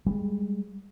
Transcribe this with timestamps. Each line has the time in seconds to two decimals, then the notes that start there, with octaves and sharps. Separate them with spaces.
0.06 G3 G#3